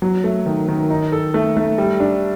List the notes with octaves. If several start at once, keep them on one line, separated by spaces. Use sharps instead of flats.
F#3
A3
D#3
D#3
D#4
A4
A3
A3
G3
D4